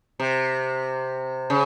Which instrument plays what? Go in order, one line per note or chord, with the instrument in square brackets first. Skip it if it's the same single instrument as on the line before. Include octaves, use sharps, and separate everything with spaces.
[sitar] C3
C#3